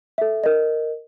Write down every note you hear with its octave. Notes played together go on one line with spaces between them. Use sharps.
A4 E5
A#4 D#5